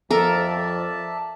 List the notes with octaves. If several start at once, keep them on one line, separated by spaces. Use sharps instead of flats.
F2 F3 A4 A#4 D5 E5 A5